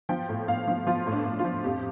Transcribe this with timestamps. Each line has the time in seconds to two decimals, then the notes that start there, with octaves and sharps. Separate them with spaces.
0.09 F3 G5
0.29 A2
0.48 A2 F5
0.67 F3
0.87 F3 F4
1.06 A2
1.12 D4
1.25 A2
1.39 F4
1.44 F3
1.64 F2 G4